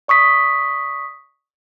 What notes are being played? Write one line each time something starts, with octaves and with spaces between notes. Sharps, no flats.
D5 C#6 D#6 B6